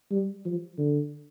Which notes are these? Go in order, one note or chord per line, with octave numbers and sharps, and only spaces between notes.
G3
F3
D3